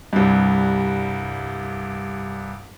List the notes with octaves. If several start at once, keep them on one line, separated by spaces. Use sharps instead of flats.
C2 G2